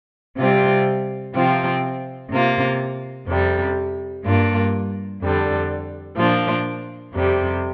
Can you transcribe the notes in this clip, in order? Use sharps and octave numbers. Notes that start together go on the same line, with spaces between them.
C3 G3 C4 F4
C3 F3 C4 F4
C3 A#3 F4
F2 C3 G3
G2 G3 A#3 D4 F4
F2 D3 G3
A#2 F3 D4 F4
F2 C3 G3